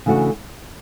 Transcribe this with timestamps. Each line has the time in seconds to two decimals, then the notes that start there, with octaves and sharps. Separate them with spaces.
0.06 C#3 E3 A3 D4 F#4